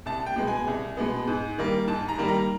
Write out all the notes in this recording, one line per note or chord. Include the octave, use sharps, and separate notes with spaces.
C2 A5
G5
B2 G#3 B3
G#5
C2
B2 G#3 B3
G#2
D#3 G3 A#3
G#2 A5
A#5
D#3 G3 A#3
A#5